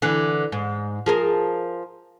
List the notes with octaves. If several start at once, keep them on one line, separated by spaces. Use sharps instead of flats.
D3 E3
G#2
F3 G#4 A#4